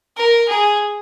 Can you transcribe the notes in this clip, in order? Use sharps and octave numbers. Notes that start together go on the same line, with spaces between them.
A#4
G#4